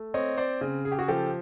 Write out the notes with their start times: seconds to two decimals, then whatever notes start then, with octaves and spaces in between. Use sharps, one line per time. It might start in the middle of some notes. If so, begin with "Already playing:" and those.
Already playing: A3
0.14 C4 C#5 D#5
0.38 C5 D5
0.61 C#3
0.85 G#4
0.92 G4
0.99 F#4 G#4
1.08 F3 G4 A4